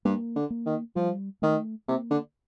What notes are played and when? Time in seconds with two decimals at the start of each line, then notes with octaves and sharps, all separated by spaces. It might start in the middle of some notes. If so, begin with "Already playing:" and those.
0.05 G2 A#3
0.36 D3
0.50 A#3
0.66 D#3
0.96 F3 G3
1.42 D#3 A3
1.88 C3 A#3
2.11 D3